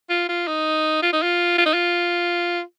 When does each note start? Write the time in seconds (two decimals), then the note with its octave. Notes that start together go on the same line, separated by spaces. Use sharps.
0.10 F4
0.29 F4
0.48 D#4
1.02 F4
1.13 D#4
1.22 F4
1.58 F4
1.66 D#4
1.74 F4